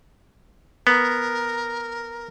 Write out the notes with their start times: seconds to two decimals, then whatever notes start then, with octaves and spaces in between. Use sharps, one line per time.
0.87 B3 A#4